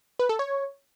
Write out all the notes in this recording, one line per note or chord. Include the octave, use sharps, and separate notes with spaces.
B4
A4
C#5